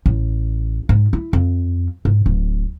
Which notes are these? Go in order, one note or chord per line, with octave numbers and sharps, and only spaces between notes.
A1
G#2
E4
F2
G#2
D1